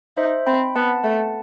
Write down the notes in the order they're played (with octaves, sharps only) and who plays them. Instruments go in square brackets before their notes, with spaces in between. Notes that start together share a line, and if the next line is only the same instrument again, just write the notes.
[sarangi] D#4 [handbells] C5 E5
[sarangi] C4 [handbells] G5 B5
[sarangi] B3 [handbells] F#5 A5
[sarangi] A3